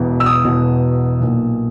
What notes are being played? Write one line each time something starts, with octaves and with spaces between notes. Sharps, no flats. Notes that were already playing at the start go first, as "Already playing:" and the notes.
Already playing: E1 E2 B2
E6
D#6
E1 E2 B2
B1 A#2